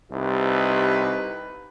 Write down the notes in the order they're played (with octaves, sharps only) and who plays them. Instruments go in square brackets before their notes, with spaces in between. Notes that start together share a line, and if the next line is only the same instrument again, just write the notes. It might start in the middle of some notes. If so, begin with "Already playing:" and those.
[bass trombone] C2 [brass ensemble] D#4 G4 B4